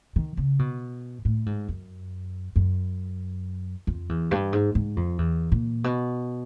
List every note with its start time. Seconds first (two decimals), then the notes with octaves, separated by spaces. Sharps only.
0.16 D#3
0.37 C#3
0.59 B2
1.25 A2
1.46 G#2
1.68 F#2
2.56 F#2
3.87 F2
4.09 E2
4.31 G2
4.53 G#2
4.75 G#2
4.97 F2
5.18 E2
5.52 A#2
5.84 B2